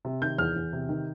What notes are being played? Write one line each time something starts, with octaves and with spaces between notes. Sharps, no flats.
C3
D#3 G6
E2 F6
E2
C3
D#3